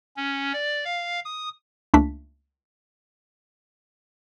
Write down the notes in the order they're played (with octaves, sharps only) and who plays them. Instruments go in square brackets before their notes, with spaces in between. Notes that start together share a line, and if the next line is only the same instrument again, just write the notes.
[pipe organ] C#4
D5
F5
D#6
[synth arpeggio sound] C#2 A3 A#3 D4 B6